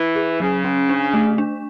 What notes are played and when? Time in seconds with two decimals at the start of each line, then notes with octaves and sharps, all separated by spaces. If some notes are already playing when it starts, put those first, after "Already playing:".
Already playing: E3
0.16 G#4
0.40 C#3 F#3
0.64 C#4
0.89 D4
1.14 A3
1.38 D4